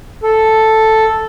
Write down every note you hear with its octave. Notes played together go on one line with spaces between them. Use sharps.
A4